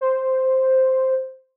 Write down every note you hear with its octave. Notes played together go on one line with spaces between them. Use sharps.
C5